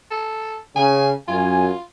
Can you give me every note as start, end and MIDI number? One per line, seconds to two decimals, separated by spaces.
0.11 0.58 69
0.76 1.12 49
0.76 1.11 80
1.28 1.69 42
1.28 1.82 65
1.28 1.69 80